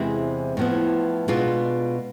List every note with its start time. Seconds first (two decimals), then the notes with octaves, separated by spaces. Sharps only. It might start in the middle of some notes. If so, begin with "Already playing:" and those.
Already playing: E2 C3 G#3 C4 E4
0.57 A2 F3 B3 E4
1.28 B2 G#3 D4 F4